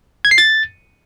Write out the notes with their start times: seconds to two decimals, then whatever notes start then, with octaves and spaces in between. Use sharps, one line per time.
0.25 G#6
0.31 C7
0.38 A6